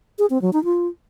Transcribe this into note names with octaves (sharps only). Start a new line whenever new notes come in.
G#4
C4
F#3
D#4
F4